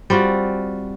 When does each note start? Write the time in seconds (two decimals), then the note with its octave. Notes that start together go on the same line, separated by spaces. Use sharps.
0.10 G3 C4 F4 F#4